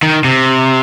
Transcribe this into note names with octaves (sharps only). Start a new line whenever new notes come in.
D#3
C3